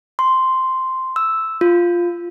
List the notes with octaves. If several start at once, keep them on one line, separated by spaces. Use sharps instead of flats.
C6
E6
F4